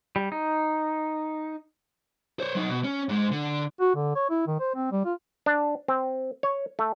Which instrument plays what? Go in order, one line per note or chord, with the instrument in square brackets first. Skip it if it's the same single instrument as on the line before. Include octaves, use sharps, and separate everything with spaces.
[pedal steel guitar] G3
D#4
[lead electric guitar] C5 C#5
F#3 D#4
B2
C#4
G#2 G#3
D3
[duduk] F#4
D3
C#5
E4
D#3
C5
C4
G3
F4
[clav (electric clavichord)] D4
C4
C#5
A3